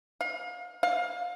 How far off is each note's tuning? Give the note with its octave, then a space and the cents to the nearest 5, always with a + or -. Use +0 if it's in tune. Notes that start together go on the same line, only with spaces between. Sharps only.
F5 +35
F5 +25